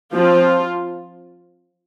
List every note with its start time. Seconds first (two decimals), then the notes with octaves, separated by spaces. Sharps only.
0.13 F3 C4 F4